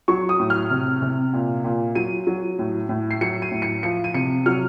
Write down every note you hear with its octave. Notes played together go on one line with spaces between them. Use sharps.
F#3 C#6
D#6
A2
F6
C3
C3
A#2
A#2
F#3 D#7
F#3
A2
A2
C7
F#3 C#7
D#7
A2
C#7
F3 C#7
D#7
C3 C#7
F#3 F6